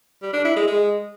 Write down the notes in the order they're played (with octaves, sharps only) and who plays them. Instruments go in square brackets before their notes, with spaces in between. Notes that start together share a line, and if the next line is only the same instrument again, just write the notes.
[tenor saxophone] G3
D4
E4
G#3
G#3